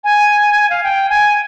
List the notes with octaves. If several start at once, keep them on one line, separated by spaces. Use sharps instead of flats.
G#5
F5
G5
G#5